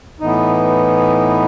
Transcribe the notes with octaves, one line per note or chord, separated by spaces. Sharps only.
A2 E3 B3 D#4